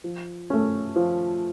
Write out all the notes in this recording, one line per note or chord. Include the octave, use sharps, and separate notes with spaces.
F3
A3 C#4
F3